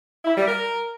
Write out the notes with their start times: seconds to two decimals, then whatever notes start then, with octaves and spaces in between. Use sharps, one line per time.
0.25 E4
0.36 G3
0.48 A#4